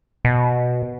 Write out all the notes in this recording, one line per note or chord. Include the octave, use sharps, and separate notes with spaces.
B2